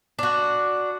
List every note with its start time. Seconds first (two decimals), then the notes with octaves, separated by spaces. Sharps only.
0.19 D4 F#4